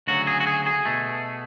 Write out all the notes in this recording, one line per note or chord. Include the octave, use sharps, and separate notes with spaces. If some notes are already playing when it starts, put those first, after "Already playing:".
D2 C#3 F#3 F#4
G#4
F#4
G#4
G#4
B2 A3